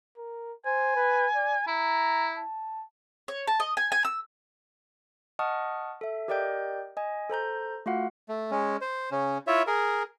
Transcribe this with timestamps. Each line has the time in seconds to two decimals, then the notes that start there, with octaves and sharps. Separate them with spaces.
0.18 A#4
0.66 C5 G#5
0.96 B4
1.36 D5
1.67 E4 A#5
2.38 A5
3.28 C#5
3.47 A5
3.60 D#5
3.77 G#5
3.92 G#5
4.05 E6
5.39 D#5 F#5 A5 C#6 D#6 F6
6.01 A4 E5
6.28 G4 A#4 D5 D#5 G5 G6
6.97 D#5 G#5
7.30 A4 C5 A#5 G6
7.86 A3 F4 F#4 F5 F#5
8.29 A3
8.51 G#3 C#4
8.81 C5
9.11 C#3 C#4
9.47 E4 F4 C#5 E5
9.67 G#4 A#4